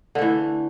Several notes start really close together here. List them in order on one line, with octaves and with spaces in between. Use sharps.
D3 A3 E3